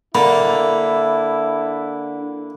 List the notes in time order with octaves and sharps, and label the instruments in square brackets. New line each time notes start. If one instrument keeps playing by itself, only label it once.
[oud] D3 [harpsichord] A#3 [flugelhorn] E4 [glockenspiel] B5